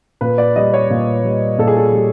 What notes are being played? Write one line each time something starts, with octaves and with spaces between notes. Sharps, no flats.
A#2 B4
D5
G3 D#5
C#5
A#2
G3
A#2 A4
G#4
A4
G3